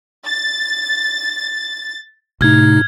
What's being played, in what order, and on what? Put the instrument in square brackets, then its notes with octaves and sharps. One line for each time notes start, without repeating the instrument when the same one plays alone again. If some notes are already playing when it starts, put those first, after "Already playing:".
[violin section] A6
[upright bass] A2 [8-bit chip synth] C3 D#4 [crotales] F6 G#6